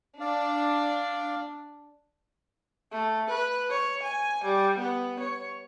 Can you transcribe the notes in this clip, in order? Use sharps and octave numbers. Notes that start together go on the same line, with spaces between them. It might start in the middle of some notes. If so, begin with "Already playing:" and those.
D4 D5 F5
A3
B4
C#5
G#5
G3
B3
C#5